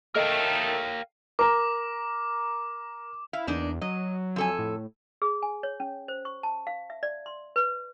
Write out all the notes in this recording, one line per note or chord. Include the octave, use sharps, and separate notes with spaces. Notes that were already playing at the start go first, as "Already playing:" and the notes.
D#3 A3 A4 A#4 D#5 F5 G5
A#4 A#5 D6
E4 F5
E2 A#3 D4 D#4
F#3 D#5
F2 A4 G#5
A2
G#4
G#5
C#5
C#4
C5
C#6
A5
F5
E5
D5
C6
B4